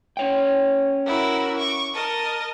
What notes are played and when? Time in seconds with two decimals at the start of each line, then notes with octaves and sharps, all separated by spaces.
0.17 C#4 C#5 G5
1.06 E4 F#4 A#4
1.57 C#6 D6
1.93 A#4 D#5 A5